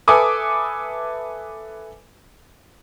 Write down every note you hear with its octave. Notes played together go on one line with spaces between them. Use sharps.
A4 B4 E5 G#5 D6 D#6